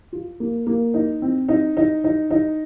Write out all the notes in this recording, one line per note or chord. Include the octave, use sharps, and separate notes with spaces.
F4
A#3
A#3
D#4
C4
D#4
D#4
D#4
D#4